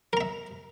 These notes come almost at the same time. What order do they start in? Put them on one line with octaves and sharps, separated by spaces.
A#4 A#5 E5